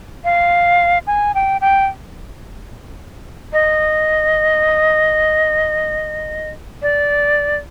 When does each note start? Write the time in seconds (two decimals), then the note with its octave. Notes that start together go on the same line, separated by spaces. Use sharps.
0.25 F5
1.07 G#5
1.35 G5
1.61 G5
3.53 D#5
6.82 D5